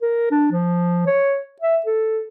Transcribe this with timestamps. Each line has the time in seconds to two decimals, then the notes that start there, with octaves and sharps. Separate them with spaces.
0.02 A#4
0.31 D4
0.51 F3
1.06 C#5
1.61 E5
1.86 A4